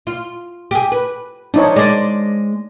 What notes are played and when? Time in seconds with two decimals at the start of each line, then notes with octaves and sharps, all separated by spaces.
0.07 F4
0.71 G4 G#4
0.92 B4
1.54 F3 D4 D#4 C#5
1.76 G#3 C5 D5